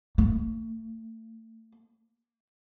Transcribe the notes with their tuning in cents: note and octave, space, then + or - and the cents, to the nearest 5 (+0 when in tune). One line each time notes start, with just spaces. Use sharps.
A3 +35